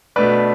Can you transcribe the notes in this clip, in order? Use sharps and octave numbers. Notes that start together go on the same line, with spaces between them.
B2 A3 D4 B4 D5